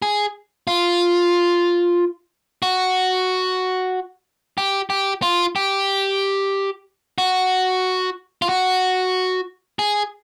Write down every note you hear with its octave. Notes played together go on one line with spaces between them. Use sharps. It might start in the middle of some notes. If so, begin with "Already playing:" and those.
G#4
F4
F#4
G4
G4
F4
G4
F#4
F4
F#4
G#4